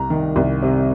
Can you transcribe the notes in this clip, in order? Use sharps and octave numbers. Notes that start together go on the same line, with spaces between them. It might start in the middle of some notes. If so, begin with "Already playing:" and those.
Already playing: C2 A#5
D#3
C2
C3